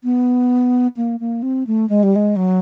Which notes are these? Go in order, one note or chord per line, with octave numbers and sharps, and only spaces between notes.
B3
A#3
A#3
C4
A3
G#3
G3
G#3
F#3